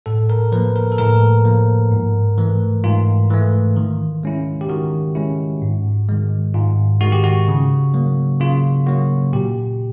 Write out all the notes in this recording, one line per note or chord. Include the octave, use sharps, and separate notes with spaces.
A2 A4
A#4
F3 A#3 B4
A#4
A4
A2 A#4
F3 A#3
G#2
E3 A3
G#2 F4
E3 A3
D#3
G#3 C#4 E4
G4
D#3 F#4
G#3 C#4 E4
G#2
D#3 G#3
G#2 F4
D#3 G#3 F#4
G4
F#4
C#3
F#3 A#3
C#3 F4
F#3 A#3 F#4
A#2 G4